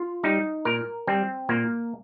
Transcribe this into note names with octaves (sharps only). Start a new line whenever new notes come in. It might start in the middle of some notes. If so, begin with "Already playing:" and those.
Already playing: F4
G3 D#4
A#2 A#4
G3 C4
A#2 A#3